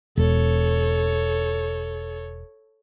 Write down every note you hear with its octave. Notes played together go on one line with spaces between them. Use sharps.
E1 A4 C#5